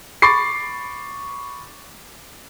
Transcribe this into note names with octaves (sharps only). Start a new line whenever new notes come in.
B5 C#6 D6 A6 C7